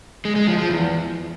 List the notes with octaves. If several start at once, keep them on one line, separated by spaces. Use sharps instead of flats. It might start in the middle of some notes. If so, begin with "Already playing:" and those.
G#3
G#3
F3
F3
E2